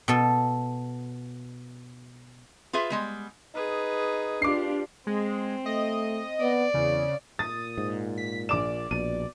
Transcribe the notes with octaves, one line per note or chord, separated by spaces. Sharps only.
B2 A4
F4 G#4 B4 E5
G3 G#3 B3
D#4 G#4 B4
D4 F4 G4 D6 C7
G#3 C4
A3 D#5
B3 D5
E2 C#3
A#2 D#6 A6
G#2
B6
A#1 D5 D6 E7
A#1 B2 D#7